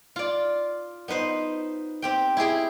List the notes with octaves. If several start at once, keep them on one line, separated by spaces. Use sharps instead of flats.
F4 D5
B3 D#4 B4 C5
C4 G4 G5
E4 G4 G#4 G5